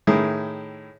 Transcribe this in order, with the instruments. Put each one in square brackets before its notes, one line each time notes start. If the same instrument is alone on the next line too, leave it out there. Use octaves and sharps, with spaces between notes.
[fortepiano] A2 D#3 E4 G#4